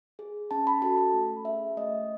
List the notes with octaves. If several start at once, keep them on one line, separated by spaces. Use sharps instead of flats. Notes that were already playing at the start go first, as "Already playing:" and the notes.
G#4
C#4 A5
B5
F#4 A4 A5
B5
A3
C#4 G#4 E5
A3 D#5